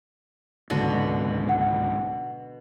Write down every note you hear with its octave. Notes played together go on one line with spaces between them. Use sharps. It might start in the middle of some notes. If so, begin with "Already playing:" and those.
D1 G#1 C#2 B2 D3 F#4
F#5